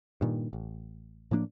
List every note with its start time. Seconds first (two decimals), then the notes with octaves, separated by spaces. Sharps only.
0.21 G2 A#2 D#3
0.53 A1
1.31 A2 F3 A#3 D4